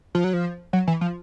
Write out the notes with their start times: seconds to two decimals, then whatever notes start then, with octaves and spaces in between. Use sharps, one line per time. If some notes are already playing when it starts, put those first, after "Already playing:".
0.15 F3
0.24 F#3
0.33 F3
0.73 F#3
0.87 E3
1.01 F3